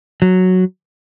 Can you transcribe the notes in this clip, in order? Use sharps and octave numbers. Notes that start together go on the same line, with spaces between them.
F#3